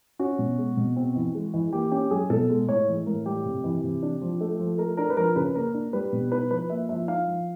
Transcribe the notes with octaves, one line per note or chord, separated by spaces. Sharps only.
C#4 F#4
B2
G#3
B2
C4
E3
G#3
E3
A#3 G4
C#4 G4
F#3 G#4
B2 A4
G#3
A2 C#5
E3
A2 A#4
G3 G4
C3
E3
C3
D4
F3
A3
F3
A3 A#4
D4 A#4
B4
F3 A#4
C#3 B4
A#3 A#4
D4
G3 B4
B2
D#4 B4
F3 B4
A#3 E5
F3 E5
D#4 F5
F3